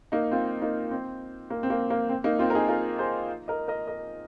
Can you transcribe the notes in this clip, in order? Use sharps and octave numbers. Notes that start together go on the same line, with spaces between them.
A#3 D#4
C4 F4
A#3 D#4
C4
A#3
C4
A#3
A#3
C4
A#3 D#4
C4 F4
A#4
D#4 G#4
F4 A#4
G#4 C5
A#4 D#5
A#4 D#5
A#4 D#5